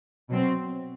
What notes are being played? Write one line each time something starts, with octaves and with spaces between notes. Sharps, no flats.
B2 F#3 C4